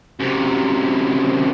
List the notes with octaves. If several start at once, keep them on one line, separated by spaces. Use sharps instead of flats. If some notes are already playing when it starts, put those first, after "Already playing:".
F#2 C3